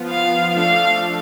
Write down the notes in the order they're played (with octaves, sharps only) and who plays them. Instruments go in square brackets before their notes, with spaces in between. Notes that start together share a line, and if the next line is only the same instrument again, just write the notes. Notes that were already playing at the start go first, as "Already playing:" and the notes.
Already playing: [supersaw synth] F3 B3 F4
[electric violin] F5
[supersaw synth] F3 A3 D4 A4 [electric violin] F5